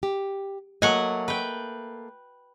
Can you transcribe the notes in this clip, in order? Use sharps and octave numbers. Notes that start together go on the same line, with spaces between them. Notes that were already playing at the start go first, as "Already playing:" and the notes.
G4
F#3 A3 A#3 D#5 F#5 G#5
B4 G5